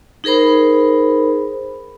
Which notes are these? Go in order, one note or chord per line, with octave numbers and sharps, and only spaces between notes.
D#4 G#4 A#4 C5 B5